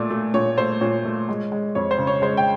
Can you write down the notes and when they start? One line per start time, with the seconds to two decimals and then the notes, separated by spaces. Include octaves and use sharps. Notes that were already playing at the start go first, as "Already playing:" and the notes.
Already playing: A#2 A3 D5
0.11 A3
0.34 A#2 C#5
0.58 A3 C5
0.81 A#2 C#5
1.05 A3
1.29 G#3
1.52 G#3
1.75 F2 C#5
1.91 C5
1.98 C#3
2.07 C#5
2.22 G#3 C5
2.37 G5